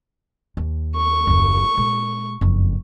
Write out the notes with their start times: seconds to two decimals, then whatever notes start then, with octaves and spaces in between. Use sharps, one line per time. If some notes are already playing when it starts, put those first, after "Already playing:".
0.57 D#2
0.96 C#6
1.27 F#1 D#2
1.77 A#2 G#3
2.41 F#1 F2